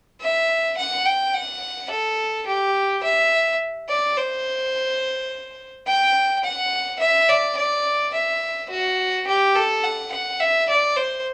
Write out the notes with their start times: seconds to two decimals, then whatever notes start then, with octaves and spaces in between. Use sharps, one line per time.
0.21 E5
0.77 F#5
1.05 G5
1.34 F#5
1.91 A4
2.47 G4
3.04 E5
3.89 D5
4.17 C5
5.87 G5
6.44 F#5
7.00 E5
7.29 D5
7.57 D5
8.14 E5
8.71 F#4
9.27 G4
9.55 A4
9.84 F#5
10.12 F#5
10.40 E5
10.69 D5
10.97 C5